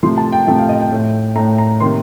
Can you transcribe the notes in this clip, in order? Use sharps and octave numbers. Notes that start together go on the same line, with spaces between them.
C3 F3 A3 C6
A5
G5
C3 F3 A3 G5
F5
D#5
G5
A2 A3
A2 A3 A#5
A#5
C3 D#3 A#3 C6